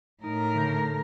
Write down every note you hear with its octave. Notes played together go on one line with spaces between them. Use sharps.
A2 D#4 A#4
D3 G6